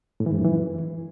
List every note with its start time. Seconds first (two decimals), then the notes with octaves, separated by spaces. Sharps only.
0.20 A2
0.26 E3
0.32 G#2
0.38 F#2
0.45 E3